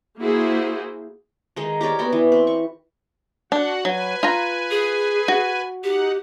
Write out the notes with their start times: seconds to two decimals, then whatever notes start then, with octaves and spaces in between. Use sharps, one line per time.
0.20 A#3 E4 F#4 G#4 C5
1.56 D#3 G#3 D#4
1.81 G4 A#4 C#5 D5
1.99 B3 F#4 G5
2.12 E3
2.32 C4
2.47 C#6
3.52 D4 F#4 F#5
3.85 F#3 B4 G#5
4.23 F4 A#5
4.71 G#4
5.28 F#4
5.84 D#4 G4 F#5